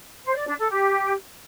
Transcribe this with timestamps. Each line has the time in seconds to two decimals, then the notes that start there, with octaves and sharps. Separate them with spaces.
0.23 C5
0.35 D5
0.46 D4
0.58 A4
0.70 G4